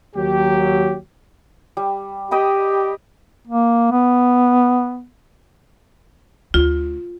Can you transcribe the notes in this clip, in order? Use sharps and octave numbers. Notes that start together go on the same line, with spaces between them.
D#2 F#3 G4
G3
G4 D#5 G5 B5
A#3
B3
D2 F4